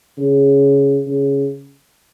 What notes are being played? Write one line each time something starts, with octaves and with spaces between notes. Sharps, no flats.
C#3
C#3